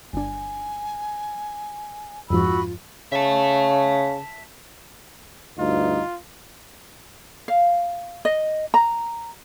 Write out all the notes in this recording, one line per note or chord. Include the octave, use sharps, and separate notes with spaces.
G1 D4 G#5
F2 G#2 F3 F4 F#4 B5 E6
C#3 E5 A5
D2 G2 D#4 F4
F5
D#5
A#5